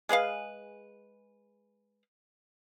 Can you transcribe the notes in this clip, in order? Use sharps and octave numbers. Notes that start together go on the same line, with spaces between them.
G#3 G#4 B4 F5